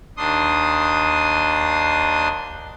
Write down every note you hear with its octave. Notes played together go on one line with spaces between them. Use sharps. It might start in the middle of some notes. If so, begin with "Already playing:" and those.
D#2 D4 C6 D#6